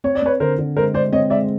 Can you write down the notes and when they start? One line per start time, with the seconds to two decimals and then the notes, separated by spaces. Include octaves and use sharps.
0.04 C4 C#5
0.15 D5
0.22 C4 B4 C#5
0.40 D3 A#4 C5
0.58 D3
0.76 G#3 A#4 C5
0.94 G#3 C5 D5
1.12 C4 C#5 D#5
1.30 G#3 D5 E5